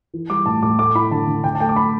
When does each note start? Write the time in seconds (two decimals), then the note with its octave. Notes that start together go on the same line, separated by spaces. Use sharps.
0.14 E3
0.30 G3 D6
0.46 A2 A5
0.63 A2 D6
0.79 A3 D6
0.95 E4 B5
1.11 D3 A5
1.28 D3
1.44 D3 G5
1.55 A5
1.60 A3 G5
1.69 D6
1.76 B5